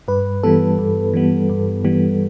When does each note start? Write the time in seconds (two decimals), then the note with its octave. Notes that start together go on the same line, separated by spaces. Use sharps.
0.08 G2 B4
0.43 E3 G3 B3 A4
0.79 G2
1.14 E3 G3 B3
1.50 G2
1.85 E3 G3 B3